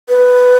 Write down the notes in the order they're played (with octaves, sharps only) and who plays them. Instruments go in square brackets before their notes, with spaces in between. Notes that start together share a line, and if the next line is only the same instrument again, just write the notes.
[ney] B4